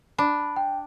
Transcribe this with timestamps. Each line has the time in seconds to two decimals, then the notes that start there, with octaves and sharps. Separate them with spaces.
0.18 D4 B5
0.56 G5